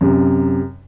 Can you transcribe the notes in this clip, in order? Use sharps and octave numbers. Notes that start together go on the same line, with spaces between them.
F#2 C3